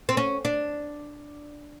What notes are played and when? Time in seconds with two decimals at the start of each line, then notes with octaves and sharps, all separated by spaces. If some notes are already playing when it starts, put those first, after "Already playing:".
0.09 C4
0.17 C#4
0.45 D4